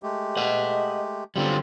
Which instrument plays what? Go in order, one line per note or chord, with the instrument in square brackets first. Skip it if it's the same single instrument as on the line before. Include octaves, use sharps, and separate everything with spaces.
[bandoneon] G#3 A3 G4
[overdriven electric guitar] D#5 F#5
[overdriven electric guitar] D3 G3 [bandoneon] F#3 C4 F4